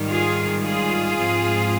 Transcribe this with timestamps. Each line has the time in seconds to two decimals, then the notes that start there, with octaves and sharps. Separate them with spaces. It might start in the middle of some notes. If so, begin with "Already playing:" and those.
Already playing: G#2 D#3 G3
0.09 F4 G#4
0.63 F4 G#4
1.18 G#2 F3 C4